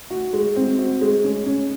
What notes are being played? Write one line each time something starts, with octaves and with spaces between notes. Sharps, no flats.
F#4
G#3
C4
F#4
G#3
C#4
C#4